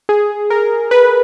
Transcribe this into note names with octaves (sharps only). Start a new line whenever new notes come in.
G#4
A#4
B4